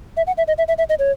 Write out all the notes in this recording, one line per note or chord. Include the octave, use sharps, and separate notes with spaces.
E5
F#5
E5
D#5
E5
E5
E5
D#5
C#5